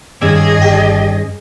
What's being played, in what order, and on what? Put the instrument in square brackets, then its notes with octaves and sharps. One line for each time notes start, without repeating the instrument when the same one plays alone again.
[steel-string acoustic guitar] G2 D#3 C#4 [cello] G#4 D#5 [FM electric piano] D6 E6 G#6
[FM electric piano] G1 G4